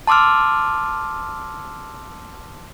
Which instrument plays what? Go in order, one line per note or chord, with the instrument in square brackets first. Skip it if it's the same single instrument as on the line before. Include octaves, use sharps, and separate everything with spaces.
[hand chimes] A5 C6 D6 E6 F6